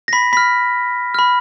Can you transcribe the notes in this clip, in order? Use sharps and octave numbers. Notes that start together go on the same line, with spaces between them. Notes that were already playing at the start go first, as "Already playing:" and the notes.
A#6
B5 B6
B5 F6 B6
B5 F6